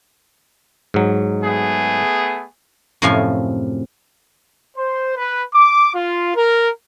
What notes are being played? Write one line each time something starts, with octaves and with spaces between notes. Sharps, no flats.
G#2 F#3
A3 B3 G#4
F#2 A2 C3 F3 F5 G#5
C5
B4
D6
F4
A#4